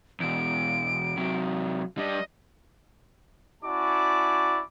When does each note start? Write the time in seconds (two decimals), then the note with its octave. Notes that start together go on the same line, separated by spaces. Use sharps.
0.20 E2 B2 D7
1.17 C3 F#3
1.98 G3 D4 D#5
3.63 C#4 E4 F#4 D5 A5 D6